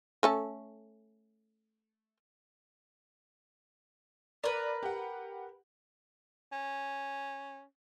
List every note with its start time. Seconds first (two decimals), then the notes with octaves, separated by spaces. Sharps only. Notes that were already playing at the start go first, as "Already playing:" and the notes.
0.23 A3 C#4 A4
4.44 A#4 B4 D5
4.83 G4 F#5
6.52 C#4